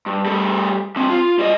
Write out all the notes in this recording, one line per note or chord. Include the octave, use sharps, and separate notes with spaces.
G2
G3 A3
E3 C4
F4
G3 D#5